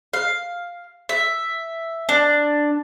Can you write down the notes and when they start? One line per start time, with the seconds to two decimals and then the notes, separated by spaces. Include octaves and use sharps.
0.13 F5
1.09 E5
2.09 D4